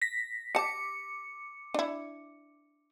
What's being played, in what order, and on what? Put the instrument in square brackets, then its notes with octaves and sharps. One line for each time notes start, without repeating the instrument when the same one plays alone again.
[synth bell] A#6 B6
[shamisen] G4 A5 [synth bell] D6 C#7
[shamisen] D4 E4